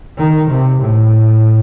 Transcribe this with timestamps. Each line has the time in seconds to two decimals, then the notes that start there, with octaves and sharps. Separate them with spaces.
0.18 D#3
0.50 C3
0.81 A2